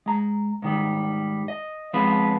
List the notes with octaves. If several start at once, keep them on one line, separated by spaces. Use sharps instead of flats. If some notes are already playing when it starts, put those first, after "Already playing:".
G#3 A#5
G#2 D#3 G3
D#5
F3 G#3 B3 C4 B4